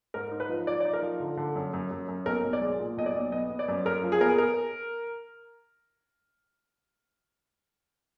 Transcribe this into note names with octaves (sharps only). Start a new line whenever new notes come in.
G#2 A#4
D#4
B4
F3
F3 D5
D5
D#4
A#4
F3
D3
D3
F#2
F#2
F#2
F#2
B1 A#4
B1
D5
G#3
A#2
B1 D#5
D5
B1
B3 D#5
B3
D5
F#2
F#2 A#4
F3
G#4
B3 A#4
G#4
A#4